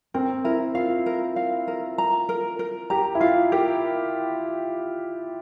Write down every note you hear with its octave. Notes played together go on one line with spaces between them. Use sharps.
C4 A#4
E4 A#4
F4 F5
A#4
F5
A#4
A#5
A#4
A#4
G4 A#5
E4
F4 F5
G4 A#4